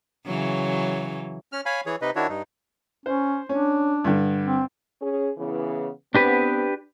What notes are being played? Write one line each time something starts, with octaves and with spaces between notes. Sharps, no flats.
C#3 E3 F#3
C#4 F6
C#5 F5 G#5 B5
E3 G#4 C#5
C3 D#4 B4 D#5
D#3 D4 E4 F#4 C#5
G2 D#4
C#4 C5
C#4 D4
G2 D3
C4
C#4 G#4
C#3 E3 B3
B3 C4 D4 G4 B4